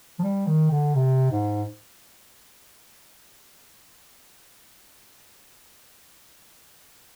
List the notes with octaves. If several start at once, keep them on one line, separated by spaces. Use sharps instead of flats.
F3
G3
D#3
D3
C3
G#2